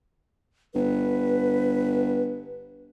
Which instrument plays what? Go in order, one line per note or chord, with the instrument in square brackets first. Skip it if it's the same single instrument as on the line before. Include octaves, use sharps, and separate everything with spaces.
[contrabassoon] G1 [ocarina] B4